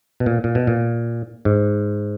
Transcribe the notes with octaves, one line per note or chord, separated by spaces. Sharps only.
B2
A#2
A#2
B2
A#2
G#2